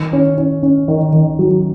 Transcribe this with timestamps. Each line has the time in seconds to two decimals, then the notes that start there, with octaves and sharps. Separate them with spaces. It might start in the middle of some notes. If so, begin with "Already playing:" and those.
Already playing: D#3
0.13 C#4
0.38 C#4
0.63 C#4
0.88 D#3
1.13 D#3
1.39 F#3